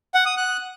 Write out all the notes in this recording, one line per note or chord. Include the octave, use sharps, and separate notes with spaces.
F#5
D#6
F#6